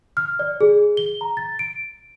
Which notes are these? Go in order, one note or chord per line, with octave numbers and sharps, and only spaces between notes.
F6
D5
G#4
G7
A#5
A6
D7